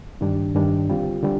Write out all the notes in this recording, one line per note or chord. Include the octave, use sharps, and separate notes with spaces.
G2 D#3 G3 D4
G2 D#3 G3 D4
D3 G3 C4 F4
D3 G3